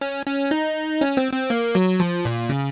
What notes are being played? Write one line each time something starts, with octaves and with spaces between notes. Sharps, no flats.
C#4
C#4
D#4
C#4
C4
C4
A#3
F#3
F3
A#2
C#3